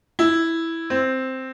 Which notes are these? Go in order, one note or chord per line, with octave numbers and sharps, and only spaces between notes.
E4
C4